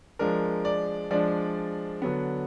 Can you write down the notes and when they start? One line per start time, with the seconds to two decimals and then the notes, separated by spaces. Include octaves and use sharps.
0.19 F3 G#3 D4 A#4
0.65 D5
1.11 F3 G#3 D4 D5
2.02 D3 F#3 B3